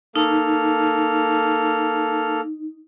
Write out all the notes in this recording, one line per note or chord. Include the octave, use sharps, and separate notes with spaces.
A#3 D#4 A4 F6